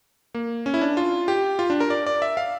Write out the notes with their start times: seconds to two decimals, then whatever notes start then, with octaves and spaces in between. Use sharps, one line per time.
0.34 A#3
0.66 C#4
0.74 E4
0.81 D4
0.97 F4
1.28 G4
1.59 F4
1.70 D4
1.80 A#4
1.90 D5
2.06 D5
2.22 E5
2.37 F5